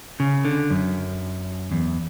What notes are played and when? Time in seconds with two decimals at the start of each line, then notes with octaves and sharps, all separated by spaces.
0.20 C#3
0.45 D3
0.71 F#2
1.72 E2